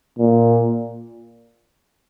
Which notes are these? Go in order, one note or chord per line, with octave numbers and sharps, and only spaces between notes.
A#2